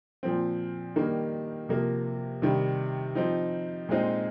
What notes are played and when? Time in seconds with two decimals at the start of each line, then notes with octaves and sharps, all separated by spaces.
0.23 A#2 F3 C4
0.96 D#3 G3 A#3 D#4
1.69 C3 F3 A#3
2.42 C3 D#3 G3
3.15 F3 C4 D#4
3.89 A#2 G#3 C4 D#4